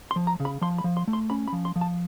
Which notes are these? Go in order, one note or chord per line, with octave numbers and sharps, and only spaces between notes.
C6
F3
A#5
C#3
B5
F3 C6
B5
F3
C6
A3
C6
C#4 B5
B5
F3
C6
F3
A5